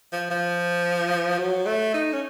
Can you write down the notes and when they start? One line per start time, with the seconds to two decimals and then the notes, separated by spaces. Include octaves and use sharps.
0.12 F3
0.30 F3
1.39 F#3
1.66 A3
1.94 D#4
2.13 C#4